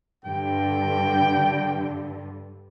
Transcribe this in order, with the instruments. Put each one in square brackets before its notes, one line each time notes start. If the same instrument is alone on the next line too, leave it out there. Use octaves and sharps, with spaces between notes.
[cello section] G2 D3 [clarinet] G5